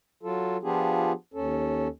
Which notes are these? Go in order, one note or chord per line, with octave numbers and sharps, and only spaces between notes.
F#3 F4 A4
F3 B3 D4 F4 G4 G#4
D#2 C#4 A4